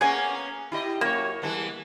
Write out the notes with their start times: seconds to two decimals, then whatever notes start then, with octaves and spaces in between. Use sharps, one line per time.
0.01 A#3 B3 C#4 G#4 F#5 G#5
0.72 E4 G4 D#5
1.01 F#2 A#3 C#5
1.42 E3 G3 B3